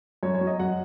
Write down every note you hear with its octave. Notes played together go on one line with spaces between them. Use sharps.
F#2 C#5
C#5
F#3
D#5
F#2 F#5